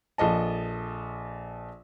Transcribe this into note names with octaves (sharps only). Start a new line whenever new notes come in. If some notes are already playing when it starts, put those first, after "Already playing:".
A#1 A4 D#5 A5